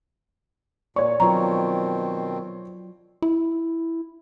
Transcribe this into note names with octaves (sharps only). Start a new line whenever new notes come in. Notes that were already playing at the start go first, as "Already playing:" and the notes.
A#2 C#5 D5 C#6
B2 D#3 F#3 C4 F4 A#5
E4